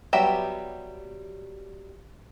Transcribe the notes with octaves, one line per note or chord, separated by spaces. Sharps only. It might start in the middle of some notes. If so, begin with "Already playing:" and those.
F#3 G3 B3 G4 E5